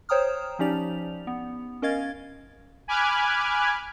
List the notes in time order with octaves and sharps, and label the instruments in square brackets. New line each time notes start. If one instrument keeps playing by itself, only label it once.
[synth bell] C5 C#5 G5 A#5 D#6 F6
F3 C#4 D#4 G4 D5 F7
B3
C#4 A#4 D#5 F5 G#6 A6
[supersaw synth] G#5 B5 D6 F6 F#6 G#6